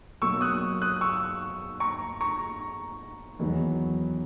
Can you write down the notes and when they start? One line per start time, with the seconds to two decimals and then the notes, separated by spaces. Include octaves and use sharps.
0.22 B2 F#3 A#3 C#6 E6
0.41 D#6 F#6
0.82 D#6 F#6
1.01 C#6 E6
1.80 A#5 C#6
2.21 A#5 C#6
3.39 E2 D#3 F#3 B3